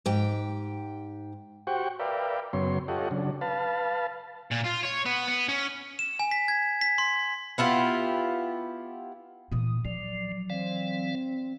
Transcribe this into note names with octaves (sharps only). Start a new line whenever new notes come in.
G#2 G4 G5
F#4 G4 C5 F#5 G5 C#6
A#4 B4 D5 E5 F5 G5
F#2 C#3 F#3 B3 C#5 C6
F4 G4 A4 C#5 D#5 F#5
C#3 F#3 D4
B4 F5 A5
A#2
F4
C#5
B3
B3
C#4
E7
G#5
B6
G#6
B6
C6
B3 E4 F4 G4
A#2 E3 D#6
F3 F#3 D5
E3 C4 D5 F5